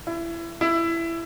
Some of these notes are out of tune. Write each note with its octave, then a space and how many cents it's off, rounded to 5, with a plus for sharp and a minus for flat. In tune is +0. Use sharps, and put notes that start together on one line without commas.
E4 +25
E4 +15